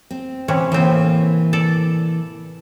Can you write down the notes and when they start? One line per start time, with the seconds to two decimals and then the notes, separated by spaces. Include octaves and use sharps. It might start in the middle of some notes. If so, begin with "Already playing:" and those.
0.11 C4
0.48 C3 E3 C#4
0.72 A2 E3 A#3 C4
1.53 A4 D5